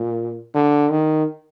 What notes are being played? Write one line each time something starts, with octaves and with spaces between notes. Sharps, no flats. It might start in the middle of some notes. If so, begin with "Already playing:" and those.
Already playing: A#2
D3
D#3